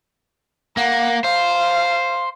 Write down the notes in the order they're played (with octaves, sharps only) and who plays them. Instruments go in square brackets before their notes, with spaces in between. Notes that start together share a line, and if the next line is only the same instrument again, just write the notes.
[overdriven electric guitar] A#3 [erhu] F#5
[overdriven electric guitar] C5 [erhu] F5